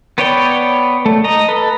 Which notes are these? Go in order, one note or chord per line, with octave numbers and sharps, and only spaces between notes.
B3 B4 C#5 D5 G5
A3
D#5 A#5
A4 B4